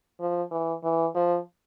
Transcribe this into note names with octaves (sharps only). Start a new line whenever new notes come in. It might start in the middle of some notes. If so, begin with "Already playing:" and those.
F3
E3
E3
F3